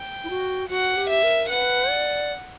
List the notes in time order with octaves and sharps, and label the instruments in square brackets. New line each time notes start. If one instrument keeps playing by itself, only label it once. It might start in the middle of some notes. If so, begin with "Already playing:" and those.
Already playing: [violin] G5
[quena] E4
F#4
[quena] F#4 [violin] F#5
[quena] G4
[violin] E5
[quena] A#4
[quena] B4 [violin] F#5
[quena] D5